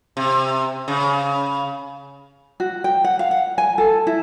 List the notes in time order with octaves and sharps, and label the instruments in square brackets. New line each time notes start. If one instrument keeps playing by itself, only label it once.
[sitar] C3
C#3
[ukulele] F#4
G5
F#5
F5
F#5
G#5
A4
E4